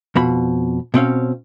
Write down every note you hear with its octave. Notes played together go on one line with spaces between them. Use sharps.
F2 B2 B5
B2 C4 C#4 F5